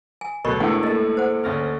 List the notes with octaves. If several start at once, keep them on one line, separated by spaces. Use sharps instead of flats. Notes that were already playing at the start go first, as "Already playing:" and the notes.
G#5
D2 B2 F#3 A3 A#4 D#5 B5 C#6
E2 A2 G#3 A3 D4 F#5
A#3 A4 D#5
C5 F#5
D2 C#4 D6 F6 A6 A#6